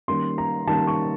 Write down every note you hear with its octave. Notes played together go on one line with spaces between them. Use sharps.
D#3 G3 A#3 C#4 C6
A#5
D#3 G3 A#3 C#4 A5
C#6